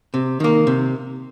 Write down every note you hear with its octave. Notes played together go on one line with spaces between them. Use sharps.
C3
D#3 A#3
C3